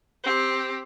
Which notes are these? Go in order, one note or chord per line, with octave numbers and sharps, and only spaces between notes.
C4 G4